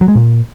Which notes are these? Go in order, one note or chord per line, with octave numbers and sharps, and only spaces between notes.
F#3
G#3
A#2